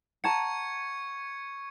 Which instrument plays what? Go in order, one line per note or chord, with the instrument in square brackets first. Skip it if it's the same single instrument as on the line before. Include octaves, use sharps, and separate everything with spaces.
[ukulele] F#5 A5 A#5 [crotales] C#6 G#6 C#7